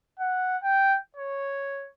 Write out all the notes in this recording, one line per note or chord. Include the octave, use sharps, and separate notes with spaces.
F#5
G5
C#5